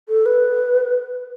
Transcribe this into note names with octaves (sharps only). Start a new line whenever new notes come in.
A4
B4